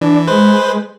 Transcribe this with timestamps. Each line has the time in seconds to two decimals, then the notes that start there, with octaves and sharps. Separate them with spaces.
0.01 E3 D4
0.27 G#3 B4 C5